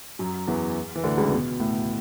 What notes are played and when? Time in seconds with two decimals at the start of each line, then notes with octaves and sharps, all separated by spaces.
0.19 F#2 F#3
0.47 E2 E3
0.95 E3
1.04 D2 D3
1.17 C#2 C#3
1.32 B2
1.60 A2